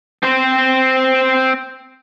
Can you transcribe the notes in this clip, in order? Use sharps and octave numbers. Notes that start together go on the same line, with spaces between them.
C4 C5